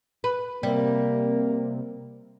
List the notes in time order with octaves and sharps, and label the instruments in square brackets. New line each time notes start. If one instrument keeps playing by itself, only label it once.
[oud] B4
[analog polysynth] C3 [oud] G3 [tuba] A#3